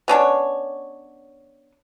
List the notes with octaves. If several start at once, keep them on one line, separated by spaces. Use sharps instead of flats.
B3 C#4 D4 C#5